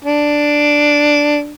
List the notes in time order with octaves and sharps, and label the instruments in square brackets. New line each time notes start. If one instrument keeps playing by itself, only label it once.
[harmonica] D4